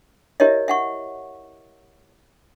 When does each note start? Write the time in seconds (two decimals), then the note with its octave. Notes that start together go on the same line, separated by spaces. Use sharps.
0.40 E4 G4 A#4 C#5 D#5 E5
0.68 E5 F#5 C#6